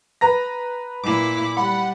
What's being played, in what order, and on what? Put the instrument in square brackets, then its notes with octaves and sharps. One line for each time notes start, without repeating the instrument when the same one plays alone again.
[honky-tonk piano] B4 A#5 A#6
[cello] A#2 E4 [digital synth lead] D6
[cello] G3 [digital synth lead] F#5 [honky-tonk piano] B5